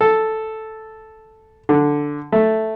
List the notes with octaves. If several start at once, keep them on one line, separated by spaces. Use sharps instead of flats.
A4
D3
A3